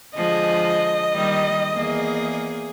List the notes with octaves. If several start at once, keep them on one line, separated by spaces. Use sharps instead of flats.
D3 F3 G#3 D#5
D#3 G3 A#3
E2 A#3 G#4